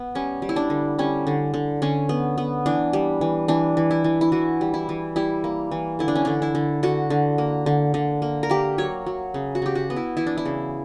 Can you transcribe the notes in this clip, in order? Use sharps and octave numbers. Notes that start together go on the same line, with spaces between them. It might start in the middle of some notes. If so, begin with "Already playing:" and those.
Already playing: B3
G3 C#4
G3
E4
D4
D3
G3 C#4
D3
D3
D3 C#4
B3
B3
E3 D4
G3
E3
E3 D4
E3
E4
E3
E4
E3 F#4
G3
E4
E3
G3 E4
A#3
E3
D3 E4
D4
C#4
D3 D4
E4
D3
D3 F#4
D3
A#3
D3
D3
A#3
A#4
A#3 G4
F#3 C#5
F#3
C#3
F#4
C#3 G4
F#4
B3
E4
E3 E4
D4
E4
C#3